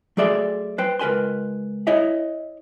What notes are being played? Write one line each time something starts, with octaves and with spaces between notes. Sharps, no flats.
F#3 A3 G#4 D5 E5 C6
B4 C5 G5
C#2 A#4 B4 G#5 C6
E4 C#5 D#5 E5